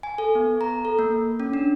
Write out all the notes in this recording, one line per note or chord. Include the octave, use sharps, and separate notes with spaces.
G#5
A4
B3
A#5
A4
A#3
C#4
D4